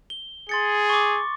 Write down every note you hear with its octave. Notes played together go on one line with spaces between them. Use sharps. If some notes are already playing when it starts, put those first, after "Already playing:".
G7
G#4 C6 A6 C#7
C#6 D6